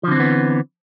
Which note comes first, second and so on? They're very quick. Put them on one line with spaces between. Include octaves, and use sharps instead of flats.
F3 D3 C4 E3 B3